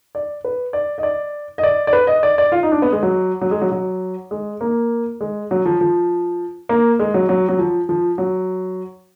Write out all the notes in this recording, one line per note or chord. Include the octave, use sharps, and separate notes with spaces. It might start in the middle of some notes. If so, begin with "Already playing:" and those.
D5
B4
D5
D#5
D5
D#5
D5
D5
B4
D#5
D5
D5
F4
D#4
D4
B3
G#3
F#3
F#3
G#3
F#3
F#3
G#3
A#3
G#3
F#3
F3
F3
A#3
G#3
F#3
F#3
F#3
F3
F3
F#3